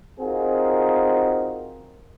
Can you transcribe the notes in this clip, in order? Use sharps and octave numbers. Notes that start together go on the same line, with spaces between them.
C4 D#4 F4 F#4 G#4 A#4